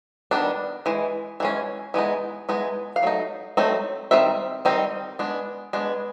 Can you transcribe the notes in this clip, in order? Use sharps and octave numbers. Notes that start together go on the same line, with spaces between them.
D#3 G3 B3 D4
E3 G#3
E3 G#3 C#4
E3 G#3 B3 D#4
E3 G#3 B3 D#4
F5
F#3 A3 D#4
F#3 A3 C4 D#4
D#3 G3 C4 E5
D#3 G3 C4 D#4
G#3 B3 D4
G#3 B3 D4